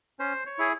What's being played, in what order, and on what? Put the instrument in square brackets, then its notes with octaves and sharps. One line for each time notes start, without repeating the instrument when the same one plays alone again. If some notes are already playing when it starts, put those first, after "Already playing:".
[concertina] C#4 C5
C#5
E4 G#4